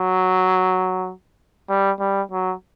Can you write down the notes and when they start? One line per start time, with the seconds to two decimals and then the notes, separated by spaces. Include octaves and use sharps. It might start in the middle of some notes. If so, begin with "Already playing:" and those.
Already playing: F#3
1.69 G3
2.00 G3
2.32 F#3